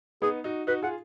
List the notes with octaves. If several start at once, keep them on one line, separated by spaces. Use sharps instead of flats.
B3 D#4 G#4
D#4 F#4
D#4 F#4 B4
F4 G#4 F#5